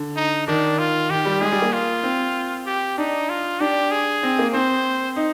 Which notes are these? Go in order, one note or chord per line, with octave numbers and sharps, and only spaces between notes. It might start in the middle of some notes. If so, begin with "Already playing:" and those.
Already playing: D3
D#4
D#3 D4
F4
D#3 G4
G3
G#3 G#4
G3
A#3
F4
C4
G4
D4 D#4
F4
D4 G4
G#4
C4
A#3
C4 C5
D#4